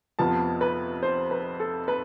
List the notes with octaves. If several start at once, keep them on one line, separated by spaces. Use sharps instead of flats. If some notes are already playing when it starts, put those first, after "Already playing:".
F2 C3 F3 B3 A5
B4
C5
B4
A4
B4